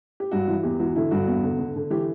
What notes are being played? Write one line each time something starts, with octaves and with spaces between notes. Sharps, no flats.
G4
G2 F#4
E3
E2 G4
E3 F#4
D3 E4
G2 F#4
E2
D3
D3
D3
E3 G4